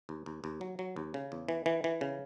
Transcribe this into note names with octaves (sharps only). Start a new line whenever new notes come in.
D#2
D#2
D#2
F#3
F#3
D#2
C#3
E2
E3
E3
E3
C#3